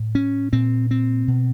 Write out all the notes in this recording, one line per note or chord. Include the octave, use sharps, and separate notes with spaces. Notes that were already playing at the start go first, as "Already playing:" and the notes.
Already playing: A2
C#4
A#2 C4
C4
B2